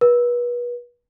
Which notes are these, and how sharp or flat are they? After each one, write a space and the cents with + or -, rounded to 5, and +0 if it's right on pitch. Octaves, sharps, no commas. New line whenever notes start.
B4 -35